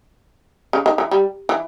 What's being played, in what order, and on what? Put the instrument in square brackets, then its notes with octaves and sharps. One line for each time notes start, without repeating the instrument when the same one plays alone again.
[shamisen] C#3
D#3
E3
G3
E3